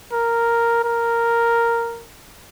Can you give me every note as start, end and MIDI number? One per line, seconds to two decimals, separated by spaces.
0.12 0.80 70
0.84 2.05 70